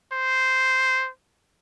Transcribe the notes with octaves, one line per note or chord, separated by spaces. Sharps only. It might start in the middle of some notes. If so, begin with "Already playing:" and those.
C5